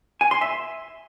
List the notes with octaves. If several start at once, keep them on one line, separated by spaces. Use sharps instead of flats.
G#5
C6
E5